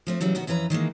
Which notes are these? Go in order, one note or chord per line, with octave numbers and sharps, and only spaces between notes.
F3 A3 C4
C#3 E3 F#3 G3
B2 D#3 B3 F#4
F2 E3 C#4 B4 A#5
D#3 E3 G#3 A#3